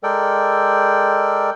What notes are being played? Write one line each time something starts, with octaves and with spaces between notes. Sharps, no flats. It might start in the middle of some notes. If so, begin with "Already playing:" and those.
G#3 A4 A#4 D5 G5